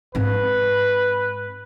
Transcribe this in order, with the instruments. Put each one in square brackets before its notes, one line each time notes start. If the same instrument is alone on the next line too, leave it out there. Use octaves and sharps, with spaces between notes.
[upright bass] G#2 C4 [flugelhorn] B4